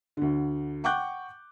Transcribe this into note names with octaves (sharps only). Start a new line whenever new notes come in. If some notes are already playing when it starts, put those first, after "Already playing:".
D2 D3
F#5 G5 C#6 D6 F#6 G6